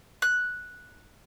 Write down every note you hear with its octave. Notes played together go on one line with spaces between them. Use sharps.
F#6